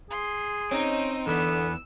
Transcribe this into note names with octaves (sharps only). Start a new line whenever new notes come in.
G#4 C6
C4 C#4 D#4 D#5
E2 D3 E3 B3 E6